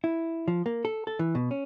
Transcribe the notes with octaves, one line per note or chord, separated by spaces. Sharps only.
E4
F3
A#3
A4
A4
E3
B2
C#4